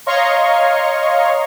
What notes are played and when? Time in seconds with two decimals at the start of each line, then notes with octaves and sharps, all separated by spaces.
0.06 C#5 D#5 F5 A#5 C6 C#6